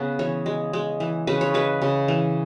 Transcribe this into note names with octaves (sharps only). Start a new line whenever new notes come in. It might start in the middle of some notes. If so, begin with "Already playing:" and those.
Already playing: C#3 B3 F#5
E3 C#5
G#3
G#3
E3
C#3 B4
C#5
G#3 B4
C#3
E3